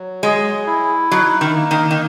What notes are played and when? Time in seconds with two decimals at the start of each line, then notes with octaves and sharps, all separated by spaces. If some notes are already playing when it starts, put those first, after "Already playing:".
Already playing: F#3
0.22 G#3 G#4
0.67 E4
1.11 F#3 D#4
1.41 D#3
1.56 A#3
1.71 D#3
1.91 D#3